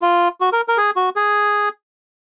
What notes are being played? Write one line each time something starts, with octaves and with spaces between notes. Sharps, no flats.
F4
F#4
A#4
A#4
G#4
F#4
G#4